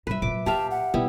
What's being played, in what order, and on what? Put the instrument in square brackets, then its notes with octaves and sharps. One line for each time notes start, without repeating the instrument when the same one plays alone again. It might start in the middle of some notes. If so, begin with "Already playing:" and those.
[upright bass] A#2 G3 [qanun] B4 E5
[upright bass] A#2 F#3 [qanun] D6
[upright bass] A#2 [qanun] G4 E5 F5 [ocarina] A5
[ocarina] F#5
[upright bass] B2 [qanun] G3 B3 E4